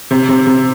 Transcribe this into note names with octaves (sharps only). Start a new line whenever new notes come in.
C3
C3
C3